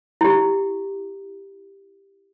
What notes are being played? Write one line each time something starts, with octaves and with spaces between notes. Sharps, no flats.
E4 G4